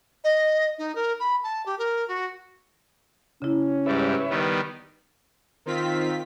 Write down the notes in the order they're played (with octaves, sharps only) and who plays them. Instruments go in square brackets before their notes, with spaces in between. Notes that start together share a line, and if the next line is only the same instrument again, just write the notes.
[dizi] D#5
D#4
A#4
B5
A5
G4
A#4
F#4
[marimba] C#3 E4 [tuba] C#4
[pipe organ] G#2 G3 [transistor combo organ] B4 C#5 E5
[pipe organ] D#3 G3 B3
[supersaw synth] D#3 C4 F4 B6